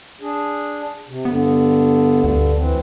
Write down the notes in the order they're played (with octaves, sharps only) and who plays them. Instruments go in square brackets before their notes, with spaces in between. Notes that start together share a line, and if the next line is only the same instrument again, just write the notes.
[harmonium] D4 G#4
C3
[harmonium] G2 D3 [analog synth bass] B3
[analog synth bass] D2
[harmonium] E3 C4